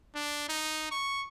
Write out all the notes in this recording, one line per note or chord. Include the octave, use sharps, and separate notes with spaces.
D4
D#4
C#6